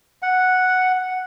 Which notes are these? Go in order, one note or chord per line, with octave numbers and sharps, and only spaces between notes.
F#5